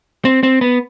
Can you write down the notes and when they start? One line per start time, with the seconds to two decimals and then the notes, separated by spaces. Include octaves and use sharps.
0.25 C4
0.43 C4
0.61 B3